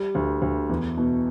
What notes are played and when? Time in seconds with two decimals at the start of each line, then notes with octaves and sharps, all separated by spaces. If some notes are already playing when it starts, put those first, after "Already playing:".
Already playing: G3
0.15 D2
0.42 D2
0.69 E2
0.97 B2